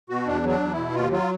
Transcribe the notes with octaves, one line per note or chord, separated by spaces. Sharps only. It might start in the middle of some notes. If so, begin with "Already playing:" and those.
B2 F#4
E2 D4
F#3
D4
E2
E4
B2
D#2 F4
F#3 F4